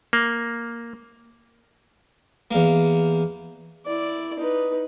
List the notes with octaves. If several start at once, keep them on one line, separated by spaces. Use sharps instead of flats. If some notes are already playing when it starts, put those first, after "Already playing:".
A#3
E2 A#3
E4 D5
D#4 B4